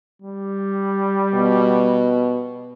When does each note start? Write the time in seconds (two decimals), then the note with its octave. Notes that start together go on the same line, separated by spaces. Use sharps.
0.22 G3
1.34 B2